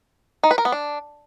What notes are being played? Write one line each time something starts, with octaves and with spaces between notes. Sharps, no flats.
D#4
B4
A#4
B3
D4